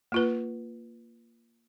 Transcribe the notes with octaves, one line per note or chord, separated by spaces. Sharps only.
A#3 F4 B4